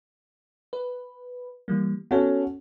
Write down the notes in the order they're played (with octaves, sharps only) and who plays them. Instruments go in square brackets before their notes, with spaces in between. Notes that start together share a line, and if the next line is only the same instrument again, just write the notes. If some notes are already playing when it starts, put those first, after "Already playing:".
[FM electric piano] B4
E3 G3 A#3
[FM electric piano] B3 A4 [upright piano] C#4 F#4